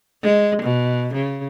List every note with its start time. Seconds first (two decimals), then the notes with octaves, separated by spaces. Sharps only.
0.23 G#3
0.62 B2
1.14 C#3